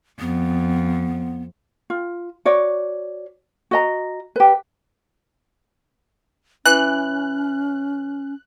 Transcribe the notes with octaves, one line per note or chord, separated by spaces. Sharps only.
F2 B3
F4
F#4 C#5 D5
F#4 D#5 A#5
G4 B4
E3 C#4 F#6